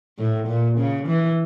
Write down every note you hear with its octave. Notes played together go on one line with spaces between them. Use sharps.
A2
A#2
C#3
E3